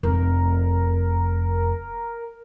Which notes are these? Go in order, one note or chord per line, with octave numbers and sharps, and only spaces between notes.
F1 A#4